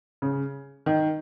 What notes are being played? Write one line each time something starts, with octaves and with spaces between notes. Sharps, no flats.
C#3
D#3